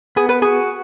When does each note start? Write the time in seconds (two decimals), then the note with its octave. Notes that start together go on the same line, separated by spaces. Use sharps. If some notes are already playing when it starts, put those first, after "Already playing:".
0.16 B3 G#4
0.29 B4
0.42 F#4 G#4